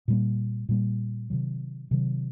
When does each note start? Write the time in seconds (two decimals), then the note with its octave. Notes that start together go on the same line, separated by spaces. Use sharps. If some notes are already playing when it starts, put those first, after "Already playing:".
0.08 A#2 G3 A#3
0.69 A#2 G3 A#3
1.30 C3 D#3 F#3
1.91 C3 D#3 F#3